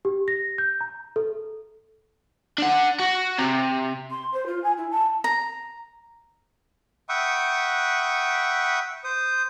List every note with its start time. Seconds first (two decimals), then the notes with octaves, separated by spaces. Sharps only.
0.05 G4
0.28 A#6
0.58 G6
0.81 A#5
1.16 A4
2.58 D4 F#5
2.99 F#4
3.38 C3
4.10 C6
4.32 C5
4.46 F4
4.63 G#5
4.77 E4
4.90 A5
5.24 A#5
7.09 E5 F#5 G5 B5 C#6 D#6
9.04 C5 D#6